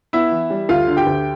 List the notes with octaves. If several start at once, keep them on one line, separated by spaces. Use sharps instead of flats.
B3 E4 E5
E3
G3
D2 F4 F5
D3
G4 G5
D2